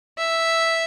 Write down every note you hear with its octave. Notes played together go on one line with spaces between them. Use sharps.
E5